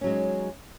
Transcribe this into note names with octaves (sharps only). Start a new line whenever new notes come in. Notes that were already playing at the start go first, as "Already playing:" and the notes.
F#3 G#3 C#4 D#4